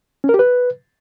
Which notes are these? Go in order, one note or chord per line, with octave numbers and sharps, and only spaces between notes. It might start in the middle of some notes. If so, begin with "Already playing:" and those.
C#4
A#4
G4
B4